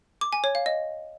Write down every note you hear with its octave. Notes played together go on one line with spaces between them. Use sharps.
D6
G#5
C#5
F5
D#5